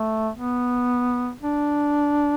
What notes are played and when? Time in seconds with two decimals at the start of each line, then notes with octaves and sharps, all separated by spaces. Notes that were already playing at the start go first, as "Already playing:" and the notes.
Already playing: A3
0.35 B3
1.42 D4